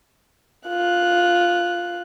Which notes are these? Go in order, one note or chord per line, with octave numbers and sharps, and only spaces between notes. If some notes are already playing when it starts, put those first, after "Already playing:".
F4 F#6